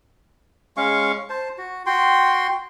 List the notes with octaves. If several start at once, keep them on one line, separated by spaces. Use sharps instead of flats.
G#3 C#4 F5 C#6
C5 A5
F#4
F#4 G5 C6